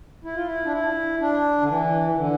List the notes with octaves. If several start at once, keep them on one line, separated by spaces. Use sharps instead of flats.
E4
F4
E4
D4
E4
D4
D3
E3
E3
D3